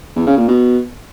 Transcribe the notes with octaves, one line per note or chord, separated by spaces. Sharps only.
E2
C#3
A#2
B2